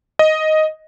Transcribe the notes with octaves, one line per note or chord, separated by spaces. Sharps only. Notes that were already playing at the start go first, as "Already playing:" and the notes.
D#5